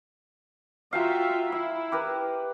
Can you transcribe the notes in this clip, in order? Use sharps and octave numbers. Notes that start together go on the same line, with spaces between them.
F4 F#4 E5 F5 G5 A#5
E4 E5
G4 A#4 B4